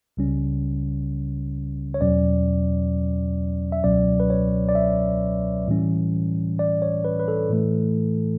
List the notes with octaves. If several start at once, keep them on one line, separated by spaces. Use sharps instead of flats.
C#2 C#3 G3 C#4
C#5
E2 B2 F#3 C#4 D5
E5
C#2 B2 F#3 C#4 D5
B4
C#5
D5
E5
A2 E3 G3 C#4
D5
C#5
B4
B4
A4
A2 E3 A3